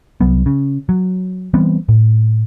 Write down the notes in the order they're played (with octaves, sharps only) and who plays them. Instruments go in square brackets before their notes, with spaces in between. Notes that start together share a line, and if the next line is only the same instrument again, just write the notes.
[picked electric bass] C2 F#3 B3
C#3
F#3
E3 G3 B3 C4
A2